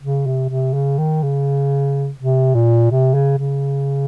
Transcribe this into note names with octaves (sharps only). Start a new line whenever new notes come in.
C#3
C3
C3
C#3
D#3
C#3
C3
A#2
C3
C#3
C#3